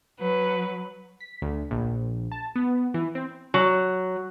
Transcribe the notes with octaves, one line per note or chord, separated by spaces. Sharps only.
F#3 B4
B6
D2
A#1
A5
B3
E3
C4
F#3